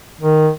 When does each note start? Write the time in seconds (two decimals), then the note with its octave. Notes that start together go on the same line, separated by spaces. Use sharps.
0.21 D#3